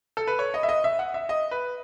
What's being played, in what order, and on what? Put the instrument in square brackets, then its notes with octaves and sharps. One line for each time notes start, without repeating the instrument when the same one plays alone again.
[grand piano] A4
B4
C#5
D#5
E5
D#5
E5
F#5
E5
D#5
B4